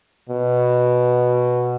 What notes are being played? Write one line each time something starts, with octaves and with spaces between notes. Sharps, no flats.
B2